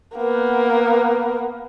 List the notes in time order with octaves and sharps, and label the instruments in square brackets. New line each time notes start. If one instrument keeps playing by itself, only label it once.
[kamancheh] A#3 B3